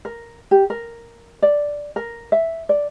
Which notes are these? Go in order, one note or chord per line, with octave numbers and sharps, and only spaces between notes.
A#4
G4
A#4
D5
A#4
E5
D5